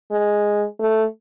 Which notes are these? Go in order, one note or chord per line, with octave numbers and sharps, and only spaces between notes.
G#3
A3